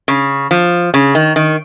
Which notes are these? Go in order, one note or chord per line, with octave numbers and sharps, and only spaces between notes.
C#3
F3
C#3
D#3
D#3